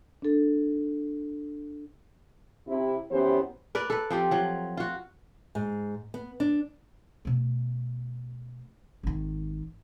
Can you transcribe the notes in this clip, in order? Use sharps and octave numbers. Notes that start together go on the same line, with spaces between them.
D4 A4
C3 E4
F#2 E3 F#3 B3 G4 C5
A#4 B4 D5
A4 B4
F3 C4 G4
F3 F#3
F4 F#4
G#2
B3
D4
B2 A3
G#1 D#3